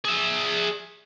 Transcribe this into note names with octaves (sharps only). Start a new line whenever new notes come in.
G#4 E5